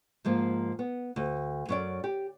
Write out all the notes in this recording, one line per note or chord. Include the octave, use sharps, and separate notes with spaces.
G#2 F3 A#3
B3
D2
F#2 C#4 D5
G4